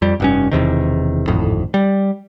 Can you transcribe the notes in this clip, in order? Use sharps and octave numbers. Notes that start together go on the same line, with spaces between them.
F2 G3
F1 G2 C#4
E1 E2 C3 D#3
D1 G#1 F2 A2
G3